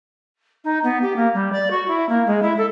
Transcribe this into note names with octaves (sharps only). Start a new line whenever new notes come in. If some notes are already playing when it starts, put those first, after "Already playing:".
D#4
B3
G4
A#3
G3
D5
F#4
E4
A#3
G#3
E4
A4